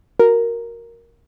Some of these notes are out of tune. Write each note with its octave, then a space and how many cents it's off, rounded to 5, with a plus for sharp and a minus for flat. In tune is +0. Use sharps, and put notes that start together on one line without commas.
F#4 +0 A#4 +0